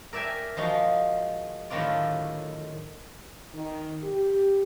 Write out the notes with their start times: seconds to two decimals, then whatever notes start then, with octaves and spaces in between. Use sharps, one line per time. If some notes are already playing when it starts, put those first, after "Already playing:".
0.13 A#4 D5 E5 G5 G#5
0.57 F3 G#3 D#4 F#4
1.70 A2 D3 D#3 F#3 F4 D5
3.54 D#3
4.02 G4